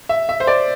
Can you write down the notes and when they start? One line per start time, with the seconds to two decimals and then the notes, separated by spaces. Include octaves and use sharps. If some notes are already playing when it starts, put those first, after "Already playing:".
0.09 E5
0.29 E5
0.40 C5
0.47 D5